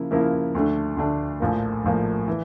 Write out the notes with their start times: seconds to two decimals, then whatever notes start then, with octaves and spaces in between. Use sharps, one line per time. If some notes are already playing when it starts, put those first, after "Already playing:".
Already playing: C#3 F3 A#3 E4
0.11 C#3 F3 A#3 E4 A#4
0.55 D2 D3 A3 D4
0.97 D2 D3 A3 D4
1.40 A#1 A2 F3 A#3
1.84 A#1 A2 F3 A#3
2.28 E3